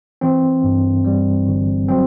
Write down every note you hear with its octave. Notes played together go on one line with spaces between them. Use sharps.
E3 C4
G2
G3
G1
F#3 C4